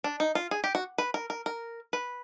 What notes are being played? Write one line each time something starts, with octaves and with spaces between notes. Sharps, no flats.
D4
D#4
F4
G#4
G4
F#4
B4
A#4
A#4
A#4
B4